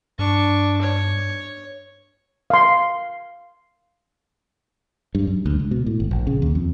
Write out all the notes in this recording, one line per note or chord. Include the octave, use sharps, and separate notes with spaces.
G2 D4 C#6
C#5
F5 C6
G2
F#2
D2
C#2
B2
A2
G1
A#1
C#3
D#2
F2